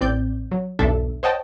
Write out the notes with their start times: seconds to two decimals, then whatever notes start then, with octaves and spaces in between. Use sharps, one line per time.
0.01 A1 C4 D5 G6
0.51 F#3
0.79 B1 E2 G2 D4 A4 E5
1.23 C5 C#5 D#5 F#5 G5 A5